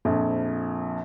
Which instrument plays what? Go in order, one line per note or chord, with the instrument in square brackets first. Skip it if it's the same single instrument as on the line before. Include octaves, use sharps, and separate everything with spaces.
[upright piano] A#1 F2